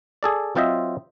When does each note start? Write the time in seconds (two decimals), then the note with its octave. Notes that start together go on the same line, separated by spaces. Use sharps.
0.23 G#4 A4 D5
0.55 F#3 C4 F4 C5 D#5 E5